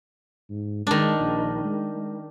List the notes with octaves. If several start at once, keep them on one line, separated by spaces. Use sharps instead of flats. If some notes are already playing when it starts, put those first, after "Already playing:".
G#2
D#3 G#3 D4
A#1
G#3
G#3